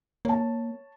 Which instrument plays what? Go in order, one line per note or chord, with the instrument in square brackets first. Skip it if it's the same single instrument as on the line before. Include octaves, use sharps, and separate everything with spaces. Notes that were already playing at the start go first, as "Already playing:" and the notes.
[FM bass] A#3 [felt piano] C#5 A5